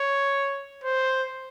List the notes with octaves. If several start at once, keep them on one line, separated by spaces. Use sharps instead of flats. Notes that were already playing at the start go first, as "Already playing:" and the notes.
Already playing: C#5
C5